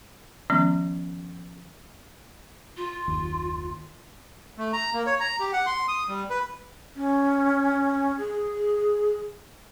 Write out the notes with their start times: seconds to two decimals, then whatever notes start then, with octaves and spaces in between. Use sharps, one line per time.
0.50 D#3 F3 G#3 B3 C#4
2.77 F4
3.08 F#1 D#2
4.58 A3
4.73 A#5
4.93 A#3
5.06 C#5
5.20 A#5
5.40 G4
5.53 F#5
5.66 C6
5.88 D#6
6.08 G3
6.30 B4
6.96 C#4
8.18 G#4